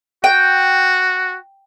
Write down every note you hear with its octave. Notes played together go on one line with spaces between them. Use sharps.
F#4 G5